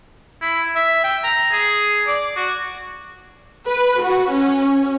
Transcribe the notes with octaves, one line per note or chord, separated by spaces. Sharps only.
E4
E5
G5
A#5
G#4
D5
F#4
B4
F#4
C#4